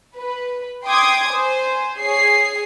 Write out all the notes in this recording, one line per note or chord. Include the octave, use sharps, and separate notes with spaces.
B4
G5 C6 D6 D#6 G#6
C5 G#5
G#4 C#5 G#5 C7